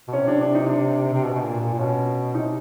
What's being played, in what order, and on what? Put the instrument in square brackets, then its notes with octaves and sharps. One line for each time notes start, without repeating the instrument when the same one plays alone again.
[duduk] B2
[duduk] C3 [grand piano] C#4
[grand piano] D4
D4
D#4
D4
[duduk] C3
B2
B2
A#2
A#2
A#2
[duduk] B2 [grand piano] C#4
[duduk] C3 [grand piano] D#4